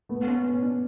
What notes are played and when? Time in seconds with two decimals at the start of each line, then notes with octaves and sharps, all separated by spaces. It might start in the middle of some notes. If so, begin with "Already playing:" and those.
0.09 A3 B3
0.27 C#4
0.45 B3 C#4
0.63 D4